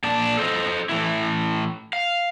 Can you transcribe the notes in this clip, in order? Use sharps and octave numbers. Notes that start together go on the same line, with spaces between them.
A#2 D5 A5
A4 C5 D#5
A2 E3 C4 E4
F5